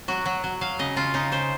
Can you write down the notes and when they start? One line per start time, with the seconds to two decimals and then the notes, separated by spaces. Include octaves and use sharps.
0.08 F#3 F#4
0.26 F#3
0.44 F#3
0.61 F#3 F5
0.79 C#3 D#5
0.96 C#3 F4
1.14 C#3 D#4
1.32 C#3 C5